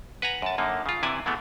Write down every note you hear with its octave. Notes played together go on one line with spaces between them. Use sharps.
B4 F#5 G#5 A#5
F#2 A5
F#2 D3 A#3 D#4
C#3 F4
C3 E3 E4 D5 G#5
B2 E3 G#3 A3 B3